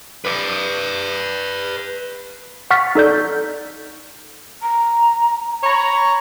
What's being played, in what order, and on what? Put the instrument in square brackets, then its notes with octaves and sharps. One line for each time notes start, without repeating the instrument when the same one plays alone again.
[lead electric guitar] B4 D5
[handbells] F#5 C#6 F6 A6 B6
D#4 A4 D5 G6
[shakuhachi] A#5
[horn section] C#5 A#5 [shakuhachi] B5